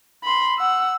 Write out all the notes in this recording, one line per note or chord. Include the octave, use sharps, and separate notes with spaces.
B5 C6
F#5 E6